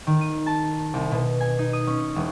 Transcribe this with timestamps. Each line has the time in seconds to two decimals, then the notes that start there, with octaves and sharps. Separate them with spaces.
0.07 D#3
0.21 D#7
0.46 A5
0.94 C2
1.11 B2
1.41 G#5
1.59 D#4
1.73 D#6
1.87 C#4
2.16 E1